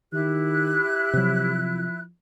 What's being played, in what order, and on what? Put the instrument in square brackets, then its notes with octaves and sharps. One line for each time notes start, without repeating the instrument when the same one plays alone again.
[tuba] D#3 [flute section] E4 F#6 [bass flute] G4
[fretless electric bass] C3 F#3 [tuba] F3